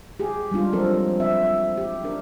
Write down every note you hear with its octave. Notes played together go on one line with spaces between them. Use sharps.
G4 G#4
G3 G#3 D4 F4
F3 F#3 C4 A4 A#4
C4 E5
G4
D4 A#4